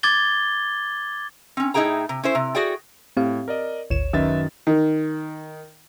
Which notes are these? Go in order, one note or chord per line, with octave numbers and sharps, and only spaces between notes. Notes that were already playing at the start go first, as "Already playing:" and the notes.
D6 G#6 A6 G7
C4 C#4
A2 D#4 E4 G#4 G5 A#5
C3
C#4 E4 C5
C3
F#4 G#4 D5 F#5 G5
A2 C4 G4 F5
A#4 D5 D#5
G#1 D2 C#5 E7
F#2 D#3 B4 E5 A6
D#3